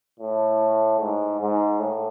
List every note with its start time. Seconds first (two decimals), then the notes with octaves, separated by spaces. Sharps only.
0.20 A2
1.00 G#2
1.40 G#2
1.80 A2